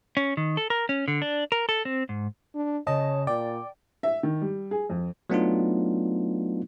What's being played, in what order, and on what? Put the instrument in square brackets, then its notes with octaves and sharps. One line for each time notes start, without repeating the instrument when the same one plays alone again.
[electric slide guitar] C#4
D#3
A4
A#4
C#4
D3
D4
A#4
A4
C4
G#2
[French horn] D4
[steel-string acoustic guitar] C#3 A5 [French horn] C#5 [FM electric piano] D#5
[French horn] A#2 [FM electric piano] D5 [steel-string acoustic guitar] G5
[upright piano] E5
D#3
G3
G#4
F2
[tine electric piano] F#3 A3 B3 D4 D#4 F4